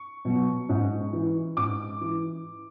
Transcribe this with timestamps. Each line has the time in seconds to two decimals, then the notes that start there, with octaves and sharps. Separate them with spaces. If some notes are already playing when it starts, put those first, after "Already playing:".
Already playing: C#6
0.25 B2 F#3
0.69 G#2
1.13 E3
1.57 G#2 D6
2.01 E3